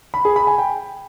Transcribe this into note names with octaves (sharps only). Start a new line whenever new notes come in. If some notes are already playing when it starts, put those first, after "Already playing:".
B5
G#4
B5
G#5
G5